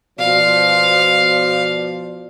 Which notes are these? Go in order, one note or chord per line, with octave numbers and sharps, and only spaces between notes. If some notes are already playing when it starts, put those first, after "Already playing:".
B2 F3 D5 F5